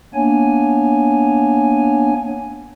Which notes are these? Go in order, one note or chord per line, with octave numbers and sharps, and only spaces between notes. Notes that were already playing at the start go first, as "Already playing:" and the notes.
A#3 B3 D4 C#5 G#5